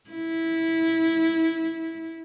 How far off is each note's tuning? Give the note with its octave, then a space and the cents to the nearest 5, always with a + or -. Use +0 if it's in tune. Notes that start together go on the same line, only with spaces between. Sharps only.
E4 -15